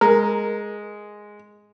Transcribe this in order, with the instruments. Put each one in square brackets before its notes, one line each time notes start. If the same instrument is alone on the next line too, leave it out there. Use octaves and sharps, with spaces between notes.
[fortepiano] G#3 [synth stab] A#4